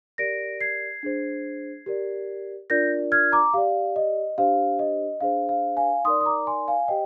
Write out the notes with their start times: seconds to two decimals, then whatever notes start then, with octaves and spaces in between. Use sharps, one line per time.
0.18 G4 A#4 D5 A#6 D7
0.61 G#6 C7
1.03 D4 G#4 C5
1.86 G4 A#4 D5
2.70 D4 F4 A#4 D5 G6 A#6
3.12 F6 G#6
3.32 A#5 D6
3.54 G4 D5 F5
3.96 D#5
4.38 D4 G4 C5 F5
4.79 D#5
5.21 D4 G#4 C5 F5
5.49 F5
5.77 F5 G#5
6.05 D#4 A#4 D5 C6 D#6
6.21 D#6
6.26 A#5 D6
6.47 G#5 C6
6.68 F5 G#5
6.88 G4 C5 D#5 G5